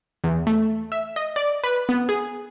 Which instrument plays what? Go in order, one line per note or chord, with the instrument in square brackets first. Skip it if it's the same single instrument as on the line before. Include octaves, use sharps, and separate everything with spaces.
[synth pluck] E2
A3
E5
D#5
D5
B4
B3
G#4